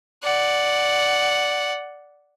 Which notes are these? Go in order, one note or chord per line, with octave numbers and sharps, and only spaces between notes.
D5 F#5